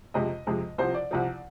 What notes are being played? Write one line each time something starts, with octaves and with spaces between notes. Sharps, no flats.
F2 C3 F3 G#3 D#5
F2 C3 F3 G#3
C2 C3 F3 C5
D5
C2 C3 F3